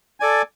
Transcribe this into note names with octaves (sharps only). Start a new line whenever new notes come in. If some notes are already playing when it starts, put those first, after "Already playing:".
A4 D5 G#5